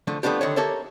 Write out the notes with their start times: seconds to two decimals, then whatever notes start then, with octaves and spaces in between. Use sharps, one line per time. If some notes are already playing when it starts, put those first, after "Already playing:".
0.07 D3 F3 A3
0.23 F3 A3 B3 D4 G4
0.41 D3 D#3 C#5
0.56 A#3 G4 A4 A#4 C#5 E5